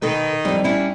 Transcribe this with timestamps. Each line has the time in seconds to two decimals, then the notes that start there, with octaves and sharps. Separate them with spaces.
0.02 B2 D#3 D#4 A4 B4
0.45 F2 E3 G3
0.64 C#4 D4 E4 C#5